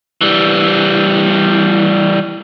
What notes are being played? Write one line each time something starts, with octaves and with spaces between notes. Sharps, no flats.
E3 G3